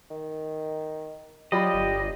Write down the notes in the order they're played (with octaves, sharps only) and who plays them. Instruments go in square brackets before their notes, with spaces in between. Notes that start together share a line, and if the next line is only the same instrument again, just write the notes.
[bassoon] D#3
[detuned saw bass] F#3 [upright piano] F4 D5 B5 [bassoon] G4 [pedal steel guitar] D#5
[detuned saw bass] G1